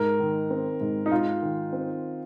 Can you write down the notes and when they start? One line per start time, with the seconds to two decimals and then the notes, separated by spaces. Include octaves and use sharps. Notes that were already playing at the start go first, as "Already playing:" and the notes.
Already playing: G#2 A#4
0.20 D#3
0.50 C4
0.81 G#2
1.06 D#4
1.11 G#2 F4
1.42 D#3
1.73 C4